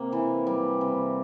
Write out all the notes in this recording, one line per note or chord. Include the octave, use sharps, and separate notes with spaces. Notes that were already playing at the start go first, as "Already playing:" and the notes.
Already playing: C3 A#3
E3
G3
C3